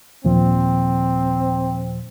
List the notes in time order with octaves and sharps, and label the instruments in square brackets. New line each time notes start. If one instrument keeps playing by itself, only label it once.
[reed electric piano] D#2 A#2 F3 [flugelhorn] C4